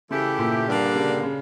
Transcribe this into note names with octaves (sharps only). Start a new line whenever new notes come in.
C#3 E3 A3 E4 G4
A#2
G2 D3 G3 A#3 D4
C#3
C#3